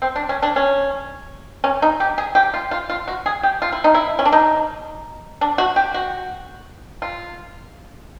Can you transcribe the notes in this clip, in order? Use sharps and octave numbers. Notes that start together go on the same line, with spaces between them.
C4
D4
C#4
D4
C#4
C#4
D#4
G4
G#4
G4
F4
F4
F4
F#4
G#4
G4
F4
E4
D#4
E4
C#4
D4
D#4
D4
F#4
G4
F#4
F4